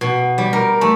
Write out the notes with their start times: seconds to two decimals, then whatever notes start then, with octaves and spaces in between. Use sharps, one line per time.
0.01 B2
0.38 G3
0.53 A#4
0.81 A3